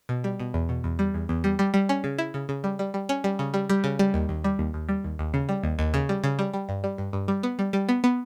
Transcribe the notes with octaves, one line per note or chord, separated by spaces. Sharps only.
B2
G3
B2
E2
B2
E2
G3
E2
E2
G3
G3
G3
C#4
C#3
E4
C#3
C#3
G3
G3
G3
C#4
G3
C#3
G3
G3
C#3
G3
D#2
D#2
G3
D#2
D#2
G3
D#2
D#2
C#3
G3
D#2
D#2
C#3
G3
C#3
G3
G3
G2
G3
G2
G2
G3
B3
G3
G3
B3
B3